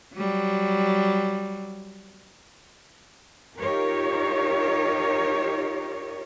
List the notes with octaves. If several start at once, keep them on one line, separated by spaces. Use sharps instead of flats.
F#3 G3
D#4 F4 G4 A#4 C#5